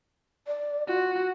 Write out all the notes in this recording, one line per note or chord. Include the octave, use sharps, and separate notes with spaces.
D5
F4 F#4